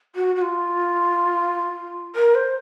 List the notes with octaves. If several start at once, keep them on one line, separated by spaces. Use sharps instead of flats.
F#4
F#4
F4
A#4
C5